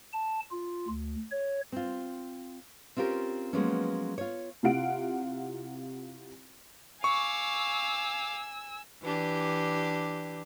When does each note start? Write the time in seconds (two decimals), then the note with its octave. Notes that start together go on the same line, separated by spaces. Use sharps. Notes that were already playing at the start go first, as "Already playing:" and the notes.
0.13 A5
0.51 F4
0.88 D2
1.31 C#5
1.72 C4 F4
2.97 C4 C#4 F4 G4 A#4
3.53 F3 F#3 G#3 A#3 B3 C#4
4.18 F4 C#5
4.63 C3 E4 F4 F5 F#5 D7
7.04 F5 G#5 C#6 D6 E6
9.03 E3 D4 G4